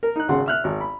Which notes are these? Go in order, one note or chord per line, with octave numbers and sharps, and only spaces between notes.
A#4
D#4 F#6
G#1 C#3 F#5 C6
E5 F6 F#6
G#1
B5